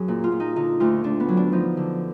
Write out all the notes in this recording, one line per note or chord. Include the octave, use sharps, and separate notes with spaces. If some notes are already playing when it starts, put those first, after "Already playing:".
Already playing: F#2 F#3 G#4 A#4
A#2
F4
A#2
D#4
D3 D#4
D2 F4
D2 D4
B3
F#3
D4
F3 D#4
D3